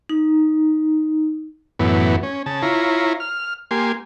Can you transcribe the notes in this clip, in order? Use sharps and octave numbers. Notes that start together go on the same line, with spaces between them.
D#4
F#2 A2 E3 B3
C#4
C#3 A5
E4 F4 C#5 A#5
F6
A#3 G4 G#5 C6